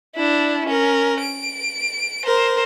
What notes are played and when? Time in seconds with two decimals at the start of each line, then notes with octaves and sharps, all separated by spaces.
0.15 D4 E4
0.66 C#4 A#4
1.20 D7
2.25 A#4 C5